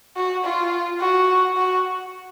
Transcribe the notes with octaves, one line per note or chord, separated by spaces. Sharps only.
F#4
F4
F#4
F#4